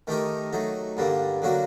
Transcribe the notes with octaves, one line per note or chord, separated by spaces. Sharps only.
D#3 A3 D#4 G4 A#4
F#3 A3 D#4
G2 D3 G3 A#3
D3 F#3 A#3 F#4